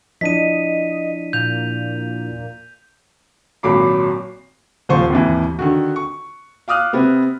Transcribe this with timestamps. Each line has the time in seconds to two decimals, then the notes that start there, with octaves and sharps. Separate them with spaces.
0.21 F3 D4 E4 D#5 B6 D#7
1.33 A#2 G6 F7
3.63 G#1 A#2 F#3 B5 D6 C7
4.89 D#1 F3 C5 F5 C#6
5.10 G#1 D#2 E3
5.59 D3 D#3 F#4
5.96 C#6
6.68 F5 D6 D#6 F6 F#6
6.93 C3 B3 C4